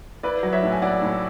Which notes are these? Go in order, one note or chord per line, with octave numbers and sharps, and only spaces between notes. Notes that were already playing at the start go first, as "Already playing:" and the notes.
E4 B4 D5
F#3
C#5 E5
A2
G#5
E4 D5 F#5
A2